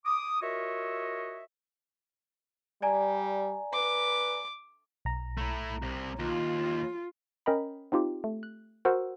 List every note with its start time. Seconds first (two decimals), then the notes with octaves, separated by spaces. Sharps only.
0.06 D6 D#6
0.42 F4 F#4 A#4 C#5 D#5 E5
2.82 G3 D5 G#5 A#5
3.73 B4 D6
5.05 B1 A#5
5.38 A3 E4
5.82 C2 C3
6.19 D#2 F4
7.46 C#4 A#4 D#5 G5 A#5 B5
7.92 C4 D#4 F4 G4
8.24 A3
8.43 F#6
8.85 F#4 A#4 C5 F#5 E6